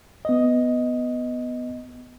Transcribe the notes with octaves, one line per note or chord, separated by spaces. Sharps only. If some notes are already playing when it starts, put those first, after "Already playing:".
B3 D#5